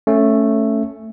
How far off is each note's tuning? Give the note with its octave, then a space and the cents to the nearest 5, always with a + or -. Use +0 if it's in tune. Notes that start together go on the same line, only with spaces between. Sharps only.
A3 +5 C#4 +0